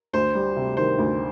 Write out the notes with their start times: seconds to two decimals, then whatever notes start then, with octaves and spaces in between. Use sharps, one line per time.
0.13 D2 C5
0.35 G3
0.56 C3
0.77 D#3 C5
0.98 D2